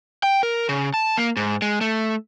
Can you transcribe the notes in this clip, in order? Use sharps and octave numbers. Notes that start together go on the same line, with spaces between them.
G5
A#4
C#3
A5
A#3
G#2
G#3
A3